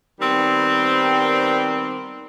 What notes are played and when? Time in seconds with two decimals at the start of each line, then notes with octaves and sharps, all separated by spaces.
0.21 D#3 G3 B3 C4